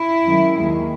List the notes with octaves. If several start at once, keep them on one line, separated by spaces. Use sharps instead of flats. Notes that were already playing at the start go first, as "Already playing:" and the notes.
Already playing: E4
F#2 D#3 G#3
D#2 D#3 G#3